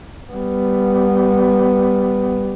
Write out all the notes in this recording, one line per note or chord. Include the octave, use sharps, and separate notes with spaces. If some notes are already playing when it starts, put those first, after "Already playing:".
G3 B3